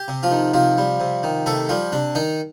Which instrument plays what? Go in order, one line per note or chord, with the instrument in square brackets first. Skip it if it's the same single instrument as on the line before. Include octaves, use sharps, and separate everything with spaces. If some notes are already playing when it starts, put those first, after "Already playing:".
Already playing: [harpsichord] G4
C3
F3 F4
D#3
C3 F3 F4
G3
C3
D#3
C3 A3 A4
F3 G3 F4
C3 D4
D#3 D#4